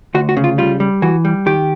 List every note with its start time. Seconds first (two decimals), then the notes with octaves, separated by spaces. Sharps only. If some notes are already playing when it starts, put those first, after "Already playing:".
0.14 D2 F#4
0.29 F#4
0.37 C#3
0.44 F4
0.58 G3 F4
0.80 G3
1.02 E3 F#4
1.25 G3
1.46 D#3 G4